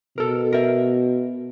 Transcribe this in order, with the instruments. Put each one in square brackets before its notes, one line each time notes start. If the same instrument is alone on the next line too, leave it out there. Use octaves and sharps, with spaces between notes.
[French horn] B2 [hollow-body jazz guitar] A4 A#4
[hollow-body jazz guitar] A#4 E5